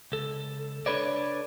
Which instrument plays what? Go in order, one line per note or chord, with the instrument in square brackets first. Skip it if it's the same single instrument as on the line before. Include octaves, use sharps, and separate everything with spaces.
[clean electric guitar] C#2 A4
D4 A4 B4 C#5 D5